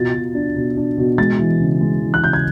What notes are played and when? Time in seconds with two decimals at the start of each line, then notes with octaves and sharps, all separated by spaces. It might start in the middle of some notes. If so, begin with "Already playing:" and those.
Already playing: B2 F4 A6
0.14 B2
0.35 D4
0.56 B2
0.77 D4
0.98 B2
1.18 G#3 A6
1.39 E3
1.60 C#3
1.81 G#3
2.02 E3
2.14 F#6
2.22 C#3 G6
2.33 G#6